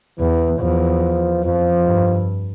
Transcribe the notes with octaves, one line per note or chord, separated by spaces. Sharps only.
E2 E3
E2 F3
F2 F3
G2